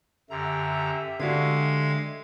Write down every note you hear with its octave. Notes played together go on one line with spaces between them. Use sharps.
F#2 D3 G4 E5 A#5
D3 G#3 D4 F#4 F5 G#6